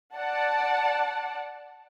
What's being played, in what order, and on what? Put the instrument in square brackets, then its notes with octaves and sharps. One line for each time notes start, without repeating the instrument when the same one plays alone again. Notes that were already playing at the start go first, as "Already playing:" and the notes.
[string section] D5 F#5 A5